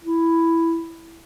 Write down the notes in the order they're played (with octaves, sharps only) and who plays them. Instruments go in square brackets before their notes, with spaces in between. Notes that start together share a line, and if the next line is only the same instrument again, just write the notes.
[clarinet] E4